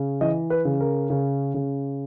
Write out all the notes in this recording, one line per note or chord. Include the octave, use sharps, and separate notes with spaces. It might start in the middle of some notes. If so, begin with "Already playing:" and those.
Already playing: C#3
E3 D#5
B4
C#3
A#4
C#3
C#3